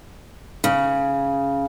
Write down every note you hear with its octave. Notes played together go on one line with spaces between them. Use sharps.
C#3